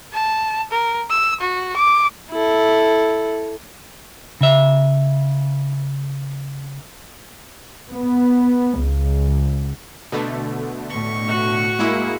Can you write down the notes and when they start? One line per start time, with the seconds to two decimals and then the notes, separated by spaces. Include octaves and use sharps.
0.13 A5
0.71 A#4
1.10 E6
1.40 F#4
1.76 D6
2.31 E4 A4
4.41 C#3 E5
7.92 B3
8.82 C#2
10.12 B2 D3 A3
10.91 A2 C#6
11.28 F#4
11.79 G#3 A#3 E4